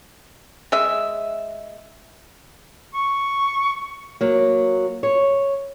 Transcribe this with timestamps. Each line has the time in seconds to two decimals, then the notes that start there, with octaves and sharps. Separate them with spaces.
0.72 G#3 E5
2.94 C#6
4.21 F#3 A#3
5.03 C#5